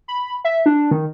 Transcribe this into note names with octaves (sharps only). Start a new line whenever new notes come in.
B5
E5
D4
D#3